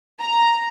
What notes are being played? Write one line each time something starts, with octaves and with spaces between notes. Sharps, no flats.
A#5